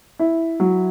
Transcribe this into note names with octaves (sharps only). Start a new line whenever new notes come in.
E4
F#3